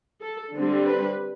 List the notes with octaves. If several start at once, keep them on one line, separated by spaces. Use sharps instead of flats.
A4
D3 G3 C4
B4